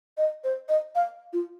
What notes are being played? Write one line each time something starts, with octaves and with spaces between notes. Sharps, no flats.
D#5
C5
D#5
F5
F4